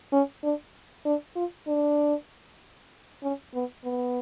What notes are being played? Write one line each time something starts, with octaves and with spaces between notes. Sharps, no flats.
C#4
D4
D4
F4
D4
C#4
B3
B3